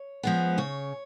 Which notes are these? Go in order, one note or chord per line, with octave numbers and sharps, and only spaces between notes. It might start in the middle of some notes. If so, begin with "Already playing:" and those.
Already playing: C#5
F3 G#3 B3
C#3 C#5